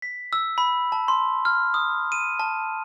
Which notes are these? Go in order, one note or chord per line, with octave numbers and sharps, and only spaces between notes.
B6
E6
B5
A5
C6
F6
D#6
D#7
A5